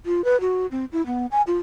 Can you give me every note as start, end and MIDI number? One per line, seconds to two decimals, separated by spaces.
0.06 0.24 65
0.24 0.40 71
0.41 0.66 66
0.71 0.85 60
0.92 1.05 64
1.06 1.26 59
1.31 1.42 80
1.47 1.58 65